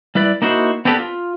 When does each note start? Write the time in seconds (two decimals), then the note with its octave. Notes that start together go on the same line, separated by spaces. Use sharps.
0.15 G3 E4 B4 D5
0.42 A#3 D#4 E4 F#4 B4 C5
0.85 B3 C4 D4 G4 A4 B4
0.99 F4